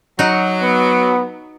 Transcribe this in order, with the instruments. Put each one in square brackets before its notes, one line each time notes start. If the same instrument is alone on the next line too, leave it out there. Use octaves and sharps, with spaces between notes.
[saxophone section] F#3 [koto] D#4 F#4
[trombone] B3